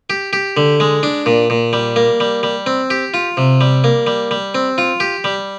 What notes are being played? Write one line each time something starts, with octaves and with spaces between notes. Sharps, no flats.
G4
G4
D3
G#3
D4
A#2
A#2
G3
A#3
G3
G3
C4
G4
F4
C3
G3
A#3
G3
G3
C4
F4
G4
G3